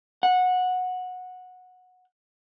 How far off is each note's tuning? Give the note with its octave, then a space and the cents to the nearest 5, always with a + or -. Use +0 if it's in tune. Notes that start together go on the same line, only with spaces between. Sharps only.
F#5 -15